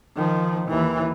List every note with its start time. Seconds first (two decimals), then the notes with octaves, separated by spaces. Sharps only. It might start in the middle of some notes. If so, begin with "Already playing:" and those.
0.16 D#3 F3
0.68 D#2 E3